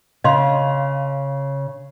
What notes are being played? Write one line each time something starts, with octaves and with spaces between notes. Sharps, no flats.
C#3 D#5 F5 C6